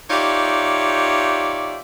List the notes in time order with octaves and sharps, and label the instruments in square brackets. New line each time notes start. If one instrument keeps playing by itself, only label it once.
[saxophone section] D#4 F4 G4 C#5 D5 E5